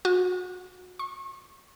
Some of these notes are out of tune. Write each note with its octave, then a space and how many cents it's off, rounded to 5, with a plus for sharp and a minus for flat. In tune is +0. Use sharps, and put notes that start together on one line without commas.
F#4 -35
C#6 -40